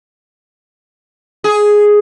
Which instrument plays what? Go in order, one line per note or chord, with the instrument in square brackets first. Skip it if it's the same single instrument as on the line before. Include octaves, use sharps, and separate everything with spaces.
[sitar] G#4